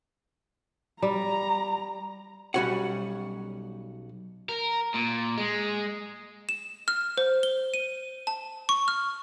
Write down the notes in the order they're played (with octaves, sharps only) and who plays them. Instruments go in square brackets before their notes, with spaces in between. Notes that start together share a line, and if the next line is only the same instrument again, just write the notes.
[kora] G3 [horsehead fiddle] A#5
[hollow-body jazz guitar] B1 G3 C#4 F#4 C#5 F#5
[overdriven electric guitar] A#4
A#2
G#3
[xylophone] E7
F6
C5
G7
D#7
A5
C#6
F6